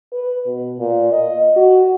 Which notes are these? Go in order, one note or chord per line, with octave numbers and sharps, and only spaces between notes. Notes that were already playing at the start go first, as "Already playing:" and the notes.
B4
B2
A#2
D#5
F#4